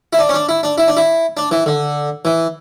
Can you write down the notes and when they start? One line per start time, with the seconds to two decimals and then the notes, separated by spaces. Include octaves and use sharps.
0.13 E4
0.19 D4
0.29 C#4
0.34 D4
0.49 E4
0.63 D4
0.78 E4
0.88 D4
0.97 E4
1.37 D4
1.51 E3
1.66 D3
2.25 E3